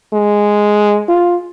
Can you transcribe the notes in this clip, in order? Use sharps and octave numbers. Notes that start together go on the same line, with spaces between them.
G#3
F4